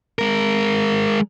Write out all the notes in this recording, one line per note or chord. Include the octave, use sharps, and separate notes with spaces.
G#3 A#4